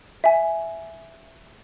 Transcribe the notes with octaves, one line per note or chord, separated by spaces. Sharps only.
E5 G#5